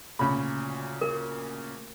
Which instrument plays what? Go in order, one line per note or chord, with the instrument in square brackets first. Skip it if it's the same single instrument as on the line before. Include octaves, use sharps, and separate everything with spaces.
[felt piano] D2 A#2 C#3 [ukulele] C#4 B5
[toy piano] A#4